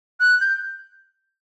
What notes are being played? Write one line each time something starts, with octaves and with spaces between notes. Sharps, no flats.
F#6
G6